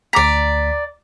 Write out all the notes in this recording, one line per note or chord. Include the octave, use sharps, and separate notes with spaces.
D2 D5 A#5 D6 B6